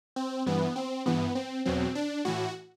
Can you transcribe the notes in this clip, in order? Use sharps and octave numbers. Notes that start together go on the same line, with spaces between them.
C4
G2 E3 B3
C4
G2 E3 B3
C4
E2 B2 F#3 C4
D4
A2 E3 F#4